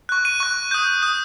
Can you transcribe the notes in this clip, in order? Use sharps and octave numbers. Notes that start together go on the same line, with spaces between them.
C#6 F#6
D#7
C#6 F#6
D#6 G6
D#6 G6